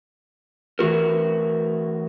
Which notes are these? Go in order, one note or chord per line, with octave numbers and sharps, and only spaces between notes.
E3 A3 F#4 A#4